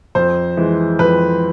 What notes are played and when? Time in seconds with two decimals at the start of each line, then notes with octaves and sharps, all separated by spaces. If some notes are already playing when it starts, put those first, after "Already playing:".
0.15 F2 C5
0.57 E3 G#3
0.99 F2 B4